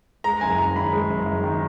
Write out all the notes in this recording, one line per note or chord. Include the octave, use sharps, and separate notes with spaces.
G#3 A#5
F#1 G#5
F#2 A#5
D#3 B5
G#3
F#1
F#2
D#3